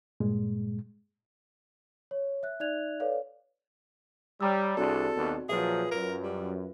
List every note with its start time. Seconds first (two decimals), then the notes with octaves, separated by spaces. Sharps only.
0.20 G2 A#2 G#3
2.11 C#5
2.43 E5 F#6
2.60 D#4 D5 E5 F#6 G#6 F7
3.00 A4 B4 C#5 D5 F5
4.41 G3 C#5 A#5 E6
4.77 C2 C4 D4 F#4 G#4 A4 D5
5.15 D#2 B2
5.49 A#2 F3 F#3 F4 G#4 B4 E5
5.92 F#2 A#4
6.23 G3